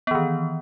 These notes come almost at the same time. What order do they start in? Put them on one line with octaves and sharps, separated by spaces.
B3 E3 D#3